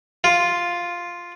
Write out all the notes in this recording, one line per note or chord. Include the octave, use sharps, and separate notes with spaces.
F4